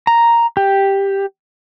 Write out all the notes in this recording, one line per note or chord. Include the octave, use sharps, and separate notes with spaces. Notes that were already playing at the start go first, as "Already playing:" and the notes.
A#5
G4